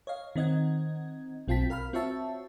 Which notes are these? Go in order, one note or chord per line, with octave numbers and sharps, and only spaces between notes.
C#5 D#5 F5
D#3 C4 D#5 F#5 G#6
B1 C4 F4 G5 A5 B6
A#4 F5 B5 F6
C4 F4 F#4 C#5 E5 A5